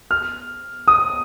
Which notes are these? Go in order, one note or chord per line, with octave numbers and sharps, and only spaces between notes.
F6
D#6